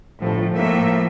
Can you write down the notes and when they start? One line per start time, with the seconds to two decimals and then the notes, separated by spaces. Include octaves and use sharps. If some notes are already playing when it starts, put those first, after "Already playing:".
0.22 G1 A2 F3
0.55 A2 A#3 E5